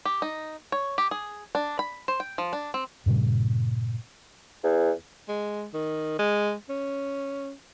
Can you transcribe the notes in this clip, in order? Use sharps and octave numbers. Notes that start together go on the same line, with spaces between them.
G4
D#4
C#5
G4
G#4
D4
B5
C5
G5
F3
D4
C4
G2 A#2 C#3 G3
E2
G#3
D#3
G#3
C#4